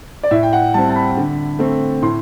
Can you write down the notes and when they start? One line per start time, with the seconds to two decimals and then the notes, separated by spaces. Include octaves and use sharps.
0.23 D5
0.31 A2 E5
0.43 G5
0.53 F#5
0.74 G3 C4 A5
0.90 A5
0.95 B5
1.17 D3
1.59 A3 C4
2.02 A2 C6